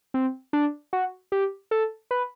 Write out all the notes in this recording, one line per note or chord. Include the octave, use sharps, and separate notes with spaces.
C4
D4
F#4
G4
A4
B4